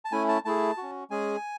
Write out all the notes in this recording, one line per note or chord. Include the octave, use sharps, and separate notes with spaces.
A5
A3 C#4 E4 G#5
A5
A3 E4 G#4 A5
C#4 F#4
G#3 C#4 G#4 G#5